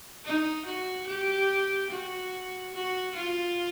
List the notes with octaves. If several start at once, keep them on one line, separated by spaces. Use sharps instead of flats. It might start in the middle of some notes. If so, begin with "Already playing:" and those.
D#4
F#4
G4
F#4
F#4
F4